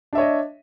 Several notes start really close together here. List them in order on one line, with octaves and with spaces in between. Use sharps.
D4 E5 C#5 D#5